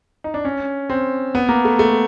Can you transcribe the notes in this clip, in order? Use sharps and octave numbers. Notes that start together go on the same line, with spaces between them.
D#4
D4
C#4
C4
B3
A#3
A3
A3